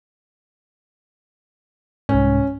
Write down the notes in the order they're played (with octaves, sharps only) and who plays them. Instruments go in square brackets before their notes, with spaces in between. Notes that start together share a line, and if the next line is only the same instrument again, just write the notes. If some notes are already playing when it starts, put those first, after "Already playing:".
[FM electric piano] C2 G#2 [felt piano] C#4